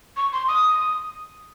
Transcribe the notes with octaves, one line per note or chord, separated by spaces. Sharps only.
C#6
C6
D#6